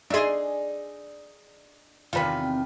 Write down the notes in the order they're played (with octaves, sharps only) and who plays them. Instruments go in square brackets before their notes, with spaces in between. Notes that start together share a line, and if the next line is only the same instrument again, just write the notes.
[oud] D4 G#4 [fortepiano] D#4 E5 C6
[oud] E2 C3 D#3 [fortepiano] F4 B4